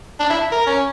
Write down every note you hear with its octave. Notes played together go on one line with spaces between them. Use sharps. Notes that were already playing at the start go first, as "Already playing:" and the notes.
D4
E4
A#4
C#4